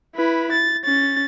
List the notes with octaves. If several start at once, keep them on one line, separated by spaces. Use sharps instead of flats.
E4 B4
A6
C#4 A6